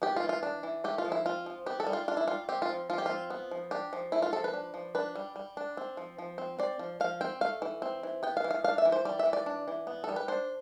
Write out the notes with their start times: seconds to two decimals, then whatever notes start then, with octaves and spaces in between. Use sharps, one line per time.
0.02 B3 G4
0.16 F4
0.23 E3
0.29 F4
0.43 D4
0.63 E3
0.84 A3 G4
0.98 F4
1.05 F3
1.12 E4
1.26 C4 F4
1.46 F3
1.66 B3 G4
1.80 A4
1.87 G3
1.93 F4
2.08 D4 F4
2.17 E4
2.28 G3 F4
2.49 C4 G4
2.62 F4
2.69 F3
2.90 F3 F4
2.98 G4
3.06 C4 F4
3.30 B3
3.51 F3
3.71 D4 G4
3.93 F3
4.12 A3 E4
4.22 F4
4.33 F3 A4
4.44 B4
4.54 D4
4.74 F3
4.95 D4 B4
5.15 G3
5.36 G3
5.57 D4
5.77 C4
5.97 F3
6.18 F3
6.38 C4
6.59 C4 D5
6.79 F3
7.00 F3 F5
7.21 C4 G5
7.41 A3 F5
7.62 E3
7.82 C4
8.03 E3
8.23 B3 G5
8.37 F5
8.44 E3
8.51 F5
8.64 D4 F5
8.78 E5
8.85 E3
8.92 C5
9.05 G3 D5
9.19 E5
9.26 E3
9.33 D5
9.46 D4
9.68 E3
9.87 B3
10.04 G3 A4
10.16 B4
10.28 D4 C5